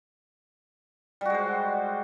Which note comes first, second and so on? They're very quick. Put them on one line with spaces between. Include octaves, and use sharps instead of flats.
G3 F#4 G#3 C5